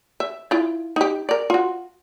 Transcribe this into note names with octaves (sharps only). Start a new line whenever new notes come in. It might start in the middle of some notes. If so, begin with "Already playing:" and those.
E5
E4 F4
D#4 G4
A#4 D5
F4 F#4